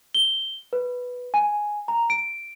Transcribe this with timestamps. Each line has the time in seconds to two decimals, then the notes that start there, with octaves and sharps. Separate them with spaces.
0.14 G7
0.73 B4
1.34 G#5
1.88 A#5
2.10 D7